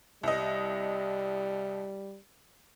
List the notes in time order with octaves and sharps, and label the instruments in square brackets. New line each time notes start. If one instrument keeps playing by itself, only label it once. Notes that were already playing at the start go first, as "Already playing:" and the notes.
[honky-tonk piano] C2 D#5 [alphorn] G3